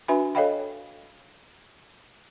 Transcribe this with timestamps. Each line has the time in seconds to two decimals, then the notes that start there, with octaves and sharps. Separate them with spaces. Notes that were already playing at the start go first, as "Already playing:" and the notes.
0.08 D4 F#4 B4 E5 G#5 B5
0.35 A4 C#5 D#5 F5 G5 B5